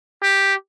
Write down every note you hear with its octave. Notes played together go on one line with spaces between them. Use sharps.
G4